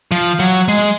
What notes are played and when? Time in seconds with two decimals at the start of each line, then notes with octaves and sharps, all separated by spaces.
0.12 F3
0.40 F#3
0.68 G#3